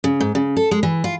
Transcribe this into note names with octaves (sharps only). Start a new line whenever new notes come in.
C#3
G#2
C#3
A4
G#3
E3
F4